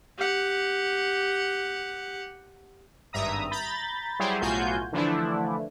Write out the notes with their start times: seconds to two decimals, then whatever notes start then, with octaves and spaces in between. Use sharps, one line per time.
0.18 G4 F#5
3.13 G#1 G2 E5 A#5 D#6
3.51 A#5 B5 G6 A6
4.19 F#3 G3 E4 G4 G#4 C5
4.41 B1 A2 F4 F#4 G#5 G6
4.93 D3 E3 F3 A3 D4 E4